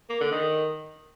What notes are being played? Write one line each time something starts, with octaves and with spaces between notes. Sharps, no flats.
A#3
D3
D#3